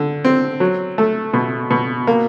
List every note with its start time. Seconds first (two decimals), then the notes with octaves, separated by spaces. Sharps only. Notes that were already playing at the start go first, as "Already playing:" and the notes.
Already playing: D3
0.25 C4
0.60 F#3
0.98 A3
1.33 B2
1.70 B2
2.07 A#3